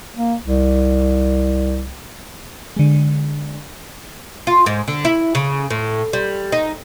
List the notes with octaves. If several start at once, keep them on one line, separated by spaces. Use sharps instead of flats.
A#3
C2
D3 G#3
F4
G#2
D3
E4
C#3
A2
G3
D#4